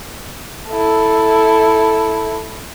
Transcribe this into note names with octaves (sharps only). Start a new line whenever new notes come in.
E4 A4